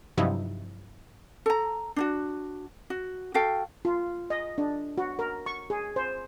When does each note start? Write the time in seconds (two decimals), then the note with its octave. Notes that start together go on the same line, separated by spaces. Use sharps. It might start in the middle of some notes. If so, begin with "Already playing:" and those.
0.17 G2 C3 F3 F#3 D#4 E4
1.46 A4 A#5
1.96 D4 E4 F#4
2.90 F#4
3.34 F#4 A4 F5 G5
3.85 F4
4.30 D#5
4.58 D4
4.98 F#4
5.19 A#4
5.46 C#6
5.70 G#4
5.96 C5